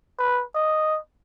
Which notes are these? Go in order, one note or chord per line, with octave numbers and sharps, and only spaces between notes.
B4
D#5